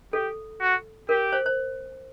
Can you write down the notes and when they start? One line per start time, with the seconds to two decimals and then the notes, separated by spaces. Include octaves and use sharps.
0.13 G4 A4
0.61 F#4
1.09 G4 A#4
1.33 C5
1.46 C5